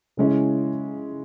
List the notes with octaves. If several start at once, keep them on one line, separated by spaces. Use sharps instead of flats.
C#3 G#3 C#4 E4